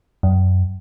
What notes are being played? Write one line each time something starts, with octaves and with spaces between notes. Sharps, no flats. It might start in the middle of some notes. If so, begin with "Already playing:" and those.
F#2